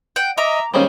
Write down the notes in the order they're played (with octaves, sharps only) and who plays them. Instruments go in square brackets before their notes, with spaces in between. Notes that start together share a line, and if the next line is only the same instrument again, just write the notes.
[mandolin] F#5 G5
[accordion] D#5 [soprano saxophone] E5 [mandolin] A#5 D6
[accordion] D#3 A#3 [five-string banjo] G3 G#3 C#4 [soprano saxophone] C5